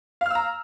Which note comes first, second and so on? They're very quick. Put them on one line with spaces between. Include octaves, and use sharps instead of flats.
F5 F6 E6 A#5